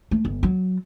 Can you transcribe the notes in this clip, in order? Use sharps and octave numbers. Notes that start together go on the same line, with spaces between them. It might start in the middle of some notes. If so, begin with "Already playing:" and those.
A3
G1
F#3